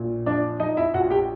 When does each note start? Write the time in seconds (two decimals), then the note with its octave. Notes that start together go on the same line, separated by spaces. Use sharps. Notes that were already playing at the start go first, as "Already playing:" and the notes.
Already playing: A#1 A#2
0.26 F3 D4 D5
0.60 F3 D#4 D#5
0.77 E4 E5
0.94 A#1 F#4 F#5
1.10 G4 G5